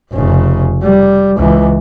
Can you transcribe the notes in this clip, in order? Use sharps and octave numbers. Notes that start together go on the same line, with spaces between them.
F1 C#3
G3
C#2 E3